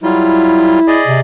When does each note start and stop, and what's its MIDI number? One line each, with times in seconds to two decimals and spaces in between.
0.03 0.80 54
0.03 0.80 55
0.03 1.01 64
0.03 0.80 65
0.88 1.20 68
0.88 1.20 74
0.88 1.20 75
1.07 1.21 48